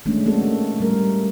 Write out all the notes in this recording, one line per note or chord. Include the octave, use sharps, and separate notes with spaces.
D#3 G#3 A3 C#4 D4
A3 A#3 F#4 A4
G3 A3 A#4